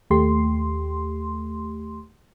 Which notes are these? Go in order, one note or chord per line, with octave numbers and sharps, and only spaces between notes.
D#2 A3 G4 C6